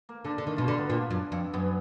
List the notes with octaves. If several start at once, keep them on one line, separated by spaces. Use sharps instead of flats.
A#3
D3 D4
D3
D#3
B2 F4
D3
B3
A#2 D4
F#2
F2
F#2 B3